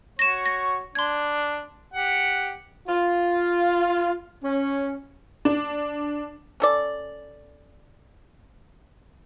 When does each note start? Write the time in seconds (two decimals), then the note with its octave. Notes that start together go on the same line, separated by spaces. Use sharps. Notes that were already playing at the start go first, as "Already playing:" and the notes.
0.19 F#4 C#5 A#6 E7
0.46 A#6
0.95 D4 C6 G#6
1.94 G4 F#5
2.88 F4
4.43 C#4
5.45 D4
6.60 C#4 A4 D5